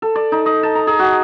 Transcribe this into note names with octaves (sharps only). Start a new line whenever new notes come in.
A4
D5
D#4
D#5
A5
A#5
G#4
F#4